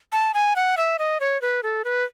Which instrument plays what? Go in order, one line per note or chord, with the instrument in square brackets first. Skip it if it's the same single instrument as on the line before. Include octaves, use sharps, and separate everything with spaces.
[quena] A5
G#5
F#5
E5
D#5
C#5
B4
A4
B4